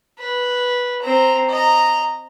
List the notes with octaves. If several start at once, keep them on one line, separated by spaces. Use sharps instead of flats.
B4
C4 A#5
D#5 A#5